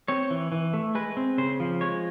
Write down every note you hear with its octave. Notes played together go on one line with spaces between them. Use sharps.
C4 C#5
E3
E3
A3
G#3 B4
C4
C#3 C5
F3
G#3 C#5